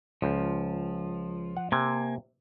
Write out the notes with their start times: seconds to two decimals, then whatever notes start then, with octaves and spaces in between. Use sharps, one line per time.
0.22 C#2 F3
1.57 F#5
1.72 C3 A#3 G#5